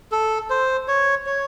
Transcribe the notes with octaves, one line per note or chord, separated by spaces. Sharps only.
A4
C5
C#5
C#5